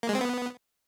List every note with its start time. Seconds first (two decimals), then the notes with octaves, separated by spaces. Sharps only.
0.03 A#3
0.09 G#3
0.15 C4
0.21 B3